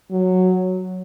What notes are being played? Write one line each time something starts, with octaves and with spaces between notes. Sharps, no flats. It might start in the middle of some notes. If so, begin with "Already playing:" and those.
F#3